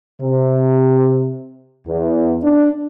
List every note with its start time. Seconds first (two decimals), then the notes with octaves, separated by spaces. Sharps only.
0.20 C3
1.87 E2
2.43 D4